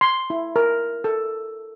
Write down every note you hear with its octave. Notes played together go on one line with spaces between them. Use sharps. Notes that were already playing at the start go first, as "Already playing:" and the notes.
C6
E4
A#4
A4